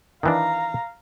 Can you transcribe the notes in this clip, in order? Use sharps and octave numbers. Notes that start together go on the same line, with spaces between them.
D#3 E3 D4 F5 A#5